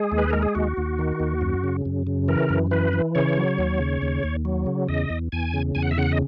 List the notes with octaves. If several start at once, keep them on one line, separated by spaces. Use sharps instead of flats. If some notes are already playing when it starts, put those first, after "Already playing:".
Already playing: G#3 G#4
D#2
B4
G#3 A#4
G#4
D#2 F#4
D#2
D#3
D#2
F#2
C#3
F#2
C#3
E3 A#4
F#2
E3 B4
E3
C#3 C#5
F#3
D#2
C#3
D#2
D#2
F#3
C#3
E2 D#5
E2
E2 G#5
C#3
E2 G#5
F#5
E5
C#3 F#5
D#5